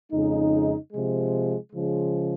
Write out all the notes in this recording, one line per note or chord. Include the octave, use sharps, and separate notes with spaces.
F2 C#3 G#3 D#4
C3 F3 G#3
C#3 F3 G#3